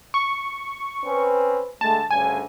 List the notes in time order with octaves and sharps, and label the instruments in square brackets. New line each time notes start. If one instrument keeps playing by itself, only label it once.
[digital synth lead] C#6
[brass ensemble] C4 C#4 B4
[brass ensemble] D3 G#3 A3 [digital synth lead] A5
[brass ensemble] D2 G2 C#3 [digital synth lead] G#5